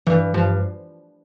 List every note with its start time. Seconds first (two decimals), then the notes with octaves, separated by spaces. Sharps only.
0.07 G2 E3
0.34 G2 F3